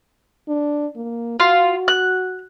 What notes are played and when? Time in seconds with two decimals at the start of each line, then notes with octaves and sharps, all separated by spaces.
0.48 D4
0.96 A#3
1.40 F4 F#4
1.88 F#6